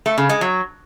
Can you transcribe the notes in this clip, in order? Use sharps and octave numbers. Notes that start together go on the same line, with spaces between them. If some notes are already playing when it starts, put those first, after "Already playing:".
A3
C#3
G#3
F#3